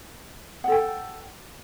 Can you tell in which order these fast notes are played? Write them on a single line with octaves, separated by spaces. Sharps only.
F#5 A4 G5